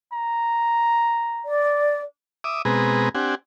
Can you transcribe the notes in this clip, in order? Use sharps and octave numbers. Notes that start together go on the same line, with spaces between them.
A#5
D5
E5 D6 D#6
B2 G#3 C4 G#4 B4 A#5
C4 D4 G4 F#5 G#5